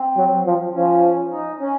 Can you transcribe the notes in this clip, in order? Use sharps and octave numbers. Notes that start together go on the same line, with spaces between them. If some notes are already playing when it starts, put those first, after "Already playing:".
Already playing: C4
F#3
F3
F3 C#4
D#4
C#4